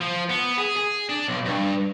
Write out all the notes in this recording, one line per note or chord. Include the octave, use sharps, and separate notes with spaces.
F3
B3
G#4
G#4
D4
B1
G2